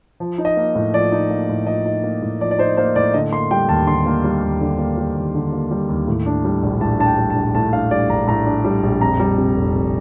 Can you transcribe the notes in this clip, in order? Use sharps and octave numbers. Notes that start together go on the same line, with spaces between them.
F3
D#4
D#5
A#3
A2
F3 D5
D#4
A#3
A2
F3 D#5
D#4
A#3
A2
F3 D5
D5
D#4 C5
A#3 C5
A2 D5
D3 D#5
A#3 C6
G3 G5
D#2 A5
D3 C6
A#3
G3
D#2
D3
A#3
G3
D#2
D3
A#3
G3
D#2
A2
D4
G3
A#1
A2 A5
D4 A5
G5
G3
A5
A#1
A2 A5
D4 F5
G3 D5
A#1 A#5
A2 A#5
D4
G3
A#1
F2 A#5
G3
C3
F1
F2